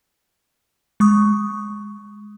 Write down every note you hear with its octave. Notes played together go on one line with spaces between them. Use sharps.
G#3 C#6 D#6